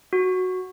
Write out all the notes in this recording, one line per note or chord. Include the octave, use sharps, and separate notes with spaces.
F#4